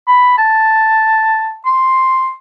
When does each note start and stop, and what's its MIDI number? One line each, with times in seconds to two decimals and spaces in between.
0.07 0.35 83
0.38 1.56 81
1.66 2.32 84